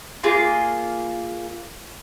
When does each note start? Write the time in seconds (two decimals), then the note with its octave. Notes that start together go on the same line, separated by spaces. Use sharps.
0.23 A#3 F4 G#4